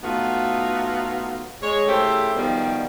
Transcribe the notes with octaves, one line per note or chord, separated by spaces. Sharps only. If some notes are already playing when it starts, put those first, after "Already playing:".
A3 B3 D#4 F4 F#4
G#3 C#5
C#3 A3 E4 G4 A4 C5
B2 D#3 F3 G3 B3